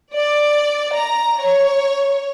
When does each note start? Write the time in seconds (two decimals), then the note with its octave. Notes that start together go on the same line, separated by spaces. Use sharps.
0.14 D5
0.92 A#5
1.40 C#5